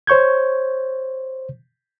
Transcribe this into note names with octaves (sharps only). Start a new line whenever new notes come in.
C5 C#5 C#6 G6 G#6